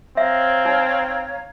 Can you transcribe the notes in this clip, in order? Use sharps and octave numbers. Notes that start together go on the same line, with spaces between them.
C4 C#5 E5 F5 A#5
D#4